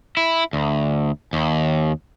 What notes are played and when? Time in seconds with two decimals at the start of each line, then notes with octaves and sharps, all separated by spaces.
0.17 E4
0.53 D2
1.33 D#2